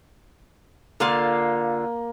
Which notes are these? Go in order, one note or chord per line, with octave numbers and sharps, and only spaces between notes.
D3 A#3 F4 F5